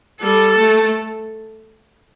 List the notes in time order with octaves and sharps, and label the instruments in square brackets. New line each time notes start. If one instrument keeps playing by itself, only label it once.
[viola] G3 [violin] A4
[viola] A3